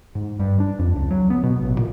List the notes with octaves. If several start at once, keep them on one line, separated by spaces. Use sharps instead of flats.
G#2
G2
D4
F2
C#2
F#3
B3
B2
A1
A#2